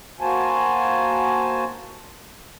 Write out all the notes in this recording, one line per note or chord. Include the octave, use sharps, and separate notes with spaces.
A#3 F#4 C5 G#5 A5